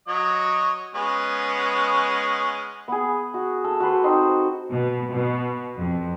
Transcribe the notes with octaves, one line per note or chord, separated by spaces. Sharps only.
F#3 C#5 D#5
G#3 B3 C#4
B3 G#4
F#4
A4
F#4 A4 B4 C5
C4 D#4 C5
B2
B2
F2